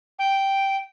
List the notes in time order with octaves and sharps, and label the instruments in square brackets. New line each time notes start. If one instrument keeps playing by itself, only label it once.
[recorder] G5